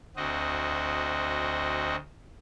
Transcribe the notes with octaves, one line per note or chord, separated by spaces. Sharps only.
D2 C4 F#4 D#5